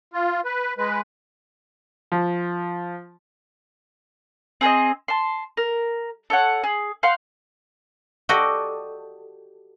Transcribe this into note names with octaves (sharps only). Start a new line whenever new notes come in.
F4
B4
G#3 B4
F3
C4 G#4 B4 D#5
A5 C6
A#4
A4 C#5 F#5
G#4
F5 F#5 C6 G6
F#4 G4 A4 D5 D#5